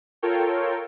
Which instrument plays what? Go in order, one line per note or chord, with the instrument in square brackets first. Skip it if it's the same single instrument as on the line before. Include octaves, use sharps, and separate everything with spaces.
[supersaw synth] F4 A4 A#4 C#5 G5